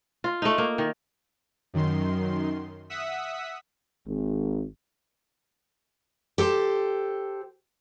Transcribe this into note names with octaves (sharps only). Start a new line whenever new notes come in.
F4
A3 D#4
A#3
D#3
F#2 D#3 C6
E5 F#5 D#6 E6 B6
G#1
G4 A4 C5